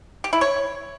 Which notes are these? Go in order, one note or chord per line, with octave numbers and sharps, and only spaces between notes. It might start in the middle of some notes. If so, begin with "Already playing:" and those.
G4
E4
C#5